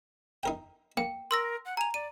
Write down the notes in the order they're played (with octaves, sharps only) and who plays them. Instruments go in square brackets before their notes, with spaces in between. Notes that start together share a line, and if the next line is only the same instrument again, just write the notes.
[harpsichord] D#4 A#4 G5
[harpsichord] A#3 [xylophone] G5
[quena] A#4 [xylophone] C6 E6 A#6
[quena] F#5
[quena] G#5 [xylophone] A#5 F7
[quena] D5 [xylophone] D#7